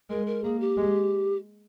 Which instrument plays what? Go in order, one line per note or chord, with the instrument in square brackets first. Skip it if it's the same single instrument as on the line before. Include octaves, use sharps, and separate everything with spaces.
[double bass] G#3 [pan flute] A#4
[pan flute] A#4
[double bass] A#3 [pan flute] G#4
[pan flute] G4
[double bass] G#3